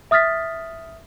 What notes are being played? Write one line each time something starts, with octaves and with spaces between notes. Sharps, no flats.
E5 D#6 F6 A6 B6